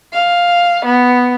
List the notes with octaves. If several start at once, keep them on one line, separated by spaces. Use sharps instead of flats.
F5
B3